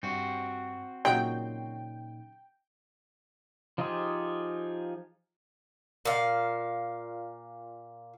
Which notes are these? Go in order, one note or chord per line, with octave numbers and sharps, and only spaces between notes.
G2 C4 F#4
A#2 C#3 F#3 D#4 G5
F3 D#4 F4 G4 G#4
A#2 F5